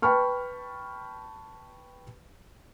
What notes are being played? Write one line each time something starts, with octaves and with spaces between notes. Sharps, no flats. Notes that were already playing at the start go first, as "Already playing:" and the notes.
B4 G5 A5 B5 C#6 F6